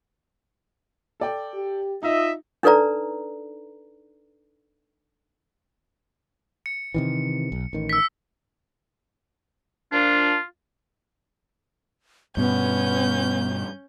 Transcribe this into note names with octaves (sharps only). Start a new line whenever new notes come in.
A4 D5 G5
G4
D#4 F4 D#5 E5
D4 D#4 A4 B4 D5 A#5
C#7
C3 D#3 E3
B1
A1 D#3
E6 B6
A#2 F3 D4 F4
G2 B2 B3 C#4 G6